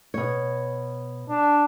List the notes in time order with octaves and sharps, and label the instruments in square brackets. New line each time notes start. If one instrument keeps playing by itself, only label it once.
[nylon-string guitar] B2 C#5
[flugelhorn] D4